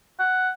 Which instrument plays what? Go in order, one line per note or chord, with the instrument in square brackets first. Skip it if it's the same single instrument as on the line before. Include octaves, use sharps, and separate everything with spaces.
[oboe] F#5